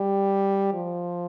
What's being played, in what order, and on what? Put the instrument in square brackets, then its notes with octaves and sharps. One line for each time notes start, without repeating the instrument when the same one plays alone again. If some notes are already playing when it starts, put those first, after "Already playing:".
Already playing: [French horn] G3
F3